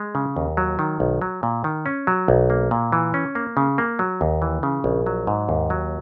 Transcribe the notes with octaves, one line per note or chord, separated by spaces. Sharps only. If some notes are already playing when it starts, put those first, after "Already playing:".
Already playing: G#3
C#3
D#2
F#3
D#3
B1
F#3
A#2
D#3
C#4
F#3
B1
A#3
A#2
E3
C#4
A#3
C#3
A#3
F#3
D#2
E3
C#3
A#1
F#3
G#2
D#2
F#3